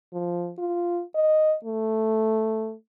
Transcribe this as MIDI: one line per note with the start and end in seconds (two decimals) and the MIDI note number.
0.13 0.52 53
0.58 1.02 65
1.16 1.56 75
1.65 2.75 57